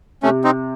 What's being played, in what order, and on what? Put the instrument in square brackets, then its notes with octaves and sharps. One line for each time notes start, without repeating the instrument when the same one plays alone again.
[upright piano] C3 [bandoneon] A3 C#4
[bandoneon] C4 D#4